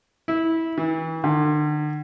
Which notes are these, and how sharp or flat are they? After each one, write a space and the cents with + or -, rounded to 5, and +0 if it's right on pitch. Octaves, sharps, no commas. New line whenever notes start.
E4 -15
E3 -35
D3 +40